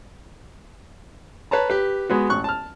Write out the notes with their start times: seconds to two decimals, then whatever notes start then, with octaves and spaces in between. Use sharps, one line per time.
1.51 B4 C#5 A5 A#5
1.70 G4 B4
2.10 G#3 B3 F#4
2.30 A1 C#6 F#6
2.44 A5 F6